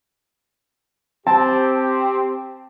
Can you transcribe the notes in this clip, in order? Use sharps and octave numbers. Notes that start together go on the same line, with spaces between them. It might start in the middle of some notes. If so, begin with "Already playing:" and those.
C4 G4 A5